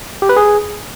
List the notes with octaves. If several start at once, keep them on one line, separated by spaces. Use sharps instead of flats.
G4
B4
G#4